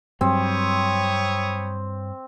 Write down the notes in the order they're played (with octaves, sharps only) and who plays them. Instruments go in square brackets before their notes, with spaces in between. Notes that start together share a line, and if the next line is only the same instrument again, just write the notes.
[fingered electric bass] G2 F#3 [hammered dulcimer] C4 [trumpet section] C#5 B5 D#6